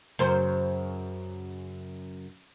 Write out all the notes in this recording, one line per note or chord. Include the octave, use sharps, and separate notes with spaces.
F#2 C#3 C5